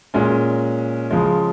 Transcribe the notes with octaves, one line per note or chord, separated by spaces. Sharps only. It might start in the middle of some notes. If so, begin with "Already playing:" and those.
A#2 G#3 C#4
C#3 F3 G#3